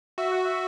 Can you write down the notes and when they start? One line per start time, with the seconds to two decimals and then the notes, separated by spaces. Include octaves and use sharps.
0.18 F#4 E5
0.32 F#5
0.45 E5